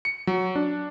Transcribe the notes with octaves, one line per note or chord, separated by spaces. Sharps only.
C#7
F#3
D4